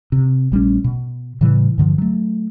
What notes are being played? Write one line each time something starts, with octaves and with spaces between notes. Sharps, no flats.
C3
A#1 G3 A3 C#4
B2
A2 C#3 E3 G3
G2 D3 D#3 F3
F#3 A3